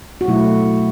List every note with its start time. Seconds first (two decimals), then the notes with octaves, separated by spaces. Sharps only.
0.21 F#4
0.28 B2 F#3 A3 E4